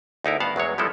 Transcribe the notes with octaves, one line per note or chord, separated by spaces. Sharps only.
D2 D#4 E4 A#4
G2 B3 F5 F#5 A5
E2 F#3 G#3 C#5
F3 G3 G#3 B3 E4 A4